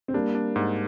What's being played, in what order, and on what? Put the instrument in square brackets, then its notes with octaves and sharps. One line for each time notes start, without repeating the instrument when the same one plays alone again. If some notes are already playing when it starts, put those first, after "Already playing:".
[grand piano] C4
[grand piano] G3 A#3 [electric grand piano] D4
[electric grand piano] D4
G#2